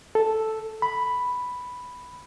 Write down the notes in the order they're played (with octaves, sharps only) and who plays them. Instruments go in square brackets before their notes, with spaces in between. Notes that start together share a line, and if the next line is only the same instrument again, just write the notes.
[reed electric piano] A4
B5